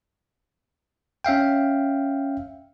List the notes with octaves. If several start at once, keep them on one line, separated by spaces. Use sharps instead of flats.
C#4 E5 F5 G5